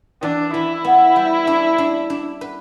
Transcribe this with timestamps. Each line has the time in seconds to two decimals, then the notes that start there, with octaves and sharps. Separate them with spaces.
0.22 E3 D4
0.54 E3 E4
0.84 B3
1.16 G3
1.47 D4
1.78 D4
2.10 D4
2.41 B4